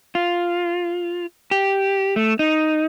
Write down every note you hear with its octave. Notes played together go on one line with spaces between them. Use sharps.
F4
G4
A3
D#4